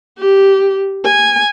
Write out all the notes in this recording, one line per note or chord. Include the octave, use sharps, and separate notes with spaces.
G4
G#5